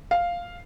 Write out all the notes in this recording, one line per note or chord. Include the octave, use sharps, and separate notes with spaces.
F5